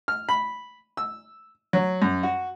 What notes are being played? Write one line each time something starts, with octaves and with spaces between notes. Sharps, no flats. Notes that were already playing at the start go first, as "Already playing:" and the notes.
F6
B5
E6
F#3
F#2
F#4